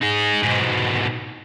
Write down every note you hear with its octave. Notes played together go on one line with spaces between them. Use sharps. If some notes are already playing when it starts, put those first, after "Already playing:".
D#4 G#4
G#2 B2